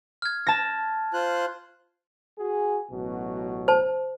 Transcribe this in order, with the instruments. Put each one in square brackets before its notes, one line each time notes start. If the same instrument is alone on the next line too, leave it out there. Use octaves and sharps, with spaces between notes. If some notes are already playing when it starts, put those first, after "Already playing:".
[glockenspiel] F6 G#6
[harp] A5 A#6
[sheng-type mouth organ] F4 C5 F#6
[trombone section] F#4 G#4
A1 B2 F#3
[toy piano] C5 A5